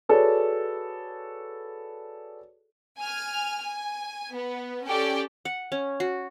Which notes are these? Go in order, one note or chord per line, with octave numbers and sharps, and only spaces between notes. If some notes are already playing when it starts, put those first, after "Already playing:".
F#4 G#4 A4 B4 C#5 D5
G#5 F6
G#5
B3
C#4 G4 A4 D5 G5
F#5
C#4
F#4